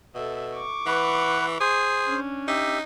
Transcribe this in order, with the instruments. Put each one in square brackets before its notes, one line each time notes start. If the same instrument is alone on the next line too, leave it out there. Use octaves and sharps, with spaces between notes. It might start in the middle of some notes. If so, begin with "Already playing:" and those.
[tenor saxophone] B2 [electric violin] A4 E5
[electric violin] C#6 D6
[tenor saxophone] E3 [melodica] B4 F#5
[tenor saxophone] G#4 [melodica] C5
[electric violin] C#4 D4
[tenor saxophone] D#4 [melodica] G4 E5